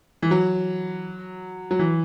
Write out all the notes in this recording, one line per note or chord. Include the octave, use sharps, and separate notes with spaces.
E3
F#3
F#3
E3